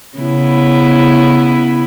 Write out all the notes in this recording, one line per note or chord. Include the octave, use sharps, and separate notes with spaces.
C#3 B3 E4